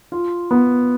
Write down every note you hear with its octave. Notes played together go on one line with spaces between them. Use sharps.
F4
B3